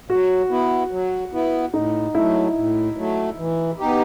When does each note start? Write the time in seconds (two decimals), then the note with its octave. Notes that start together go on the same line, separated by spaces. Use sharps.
0.09 F#3 F#4
0.51 B3 E4
0.91 F#3
1.33 B3 E4
1.74 A2 D#4
2.15 F#3 A3 E4
2.56 A2
2.97 F#3 A3
3.38 E3
3.79 B3 D#4 G4